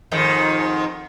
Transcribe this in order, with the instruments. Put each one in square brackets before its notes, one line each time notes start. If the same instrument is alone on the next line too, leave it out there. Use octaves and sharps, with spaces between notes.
[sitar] F2 G#2 D#3